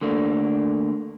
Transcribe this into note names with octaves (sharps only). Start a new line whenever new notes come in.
D3 A3 A#3 D4